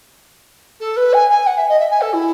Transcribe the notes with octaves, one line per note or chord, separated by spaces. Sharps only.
A4
B4
G#5
G#5
F#5
E5
D#5
E5
G#5
A4
E4